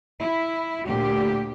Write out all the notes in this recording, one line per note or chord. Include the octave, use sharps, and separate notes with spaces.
E4
D2 A#2 G4